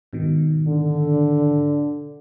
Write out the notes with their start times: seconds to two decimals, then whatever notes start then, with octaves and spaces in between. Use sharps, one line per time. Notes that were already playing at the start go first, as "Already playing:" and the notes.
0.13 G#2 B2 D#3
0.67 D3